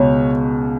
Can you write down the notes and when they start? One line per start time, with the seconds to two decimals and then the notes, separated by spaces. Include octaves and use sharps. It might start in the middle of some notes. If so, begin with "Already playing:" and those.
Already playing: C#2 B2 C#5